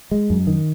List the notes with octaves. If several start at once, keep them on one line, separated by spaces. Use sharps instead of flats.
G#3
F#2
D#3